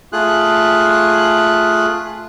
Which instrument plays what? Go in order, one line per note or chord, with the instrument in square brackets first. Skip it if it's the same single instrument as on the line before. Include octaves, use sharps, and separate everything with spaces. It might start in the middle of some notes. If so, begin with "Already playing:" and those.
[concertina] A3 F4 G#4 F#6